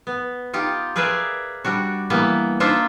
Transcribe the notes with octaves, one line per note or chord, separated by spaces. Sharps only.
B3
D#4 F4 G4
G#4 A#4 B4 D5 E5 F5
G3 D4 F#4
E3 G3 A#3 B3
A#3 D4 D#4 F4 C5 E5